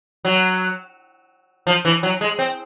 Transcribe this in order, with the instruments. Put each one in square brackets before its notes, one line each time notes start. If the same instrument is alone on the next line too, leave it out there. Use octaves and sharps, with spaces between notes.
[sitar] F#3
F3
E3
F#3
G#3
C4